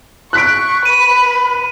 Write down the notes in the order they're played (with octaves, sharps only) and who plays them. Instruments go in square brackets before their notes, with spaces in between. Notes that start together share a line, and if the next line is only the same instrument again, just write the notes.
[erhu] C#6 [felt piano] F#6 B6 D7
[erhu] B4 [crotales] D#7